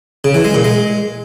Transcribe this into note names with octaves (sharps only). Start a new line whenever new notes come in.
C#3
E3
G#3
A#2
G#3